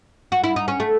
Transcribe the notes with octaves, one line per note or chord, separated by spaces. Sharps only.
F#4
E4
D#4
C#4
A3